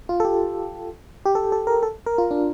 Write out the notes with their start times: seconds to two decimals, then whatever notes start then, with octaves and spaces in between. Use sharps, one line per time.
0.09 F4
0.20 A4
0.25 G4
1.26 G4
1.35 A4
1.52 A4
1.67 A#4
1.83 A4
2.06 A#4
2.18 F4
2.31 D4